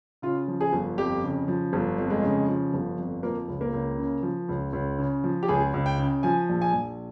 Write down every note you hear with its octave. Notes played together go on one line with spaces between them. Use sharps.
C#3 F4
F3
G#4
G1
F2 G4
C#3
F3
G1
F2
G#3
C#3
F3
G1
F2
F3 A#3
C#2
A#3
C#2
C#3
F3
C#2
C#2
C#3
F3
G4
C#2 G#4
C#2
G5
C#3
F3 G#5
A#1
G#5
A#1